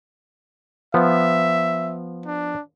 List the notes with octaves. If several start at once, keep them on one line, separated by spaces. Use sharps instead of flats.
F3 B3 E5
D4